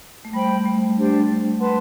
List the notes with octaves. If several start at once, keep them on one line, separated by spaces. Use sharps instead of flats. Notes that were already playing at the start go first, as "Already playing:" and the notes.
A3
G3 C5 G5 B5
A3
D4 G4 C5
B4 F#5 A5 C6